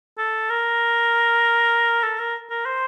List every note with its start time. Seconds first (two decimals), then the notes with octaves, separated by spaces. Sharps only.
0.18 A4
0.50 A#4
2.03 A4
2.19 A#4
2.50 A#4
2.65 C5